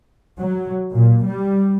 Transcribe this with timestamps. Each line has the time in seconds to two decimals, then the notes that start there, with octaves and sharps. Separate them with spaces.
0.39 F#3
0.93 A#2
1.24 G3